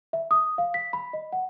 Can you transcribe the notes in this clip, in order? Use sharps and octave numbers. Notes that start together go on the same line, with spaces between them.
E5
D#6
F5
B6
B5
D#5
F#5